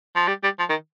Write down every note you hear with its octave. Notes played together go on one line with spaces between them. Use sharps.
F3
G3
G3
F3
D#3